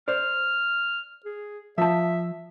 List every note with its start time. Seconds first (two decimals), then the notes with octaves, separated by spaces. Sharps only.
0.08 C5 D5 F6
1.25 G#4
1.78 F3 E5 A5